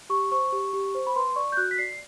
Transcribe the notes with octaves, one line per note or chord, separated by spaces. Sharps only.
G4 C#6
C5 C#6
G4
G4
C5
B5
B4 C6
D5 C#6
G6
F#4 F#6
B6
D5 C7